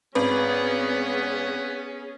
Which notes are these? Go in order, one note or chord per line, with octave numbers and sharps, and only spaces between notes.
G#1 B3 C#4 G#4 B4